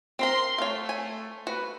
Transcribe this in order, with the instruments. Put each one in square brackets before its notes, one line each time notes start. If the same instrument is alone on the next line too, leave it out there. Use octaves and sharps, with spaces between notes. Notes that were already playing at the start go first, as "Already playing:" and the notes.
[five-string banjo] C4 A#4 A#5 [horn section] C6
[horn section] A3 [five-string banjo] C#5 F5
[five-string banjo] G#5
[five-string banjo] F#4 [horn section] B4